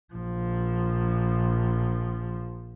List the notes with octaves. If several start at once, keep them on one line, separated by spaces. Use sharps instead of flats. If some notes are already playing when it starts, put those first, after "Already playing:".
A#1 F3